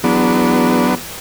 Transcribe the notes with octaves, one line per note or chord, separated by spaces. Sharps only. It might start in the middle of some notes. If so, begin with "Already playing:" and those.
E2 F#3 B3 D4